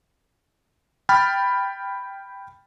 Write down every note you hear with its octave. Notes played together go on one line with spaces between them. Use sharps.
G5 B5 F6 A6